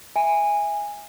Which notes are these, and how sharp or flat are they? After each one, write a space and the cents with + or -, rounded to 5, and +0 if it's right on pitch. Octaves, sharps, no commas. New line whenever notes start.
E5 +0 G#5 -15